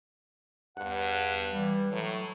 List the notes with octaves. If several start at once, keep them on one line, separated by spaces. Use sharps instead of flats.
E2 G2 F#5
E3 G3
A2 F#3